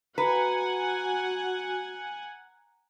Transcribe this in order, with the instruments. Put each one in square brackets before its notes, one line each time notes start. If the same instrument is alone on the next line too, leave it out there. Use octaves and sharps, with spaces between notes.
[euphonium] F#4 [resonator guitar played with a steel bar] B4 [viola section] F#5 G#5 [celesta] A#5